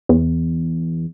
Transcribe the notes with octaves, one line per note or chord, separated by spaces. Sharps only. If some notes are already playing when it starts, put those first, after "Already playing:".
E2